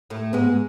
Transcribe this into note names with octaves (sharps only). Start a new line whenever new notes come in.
A2 A3
G#2 G#3 B3